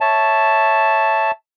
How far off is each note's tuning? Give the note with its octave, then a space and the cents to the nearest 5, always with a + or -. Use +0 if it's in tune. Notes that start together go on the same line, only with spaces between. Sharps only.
C#5 +0 E5 +0 A5 +0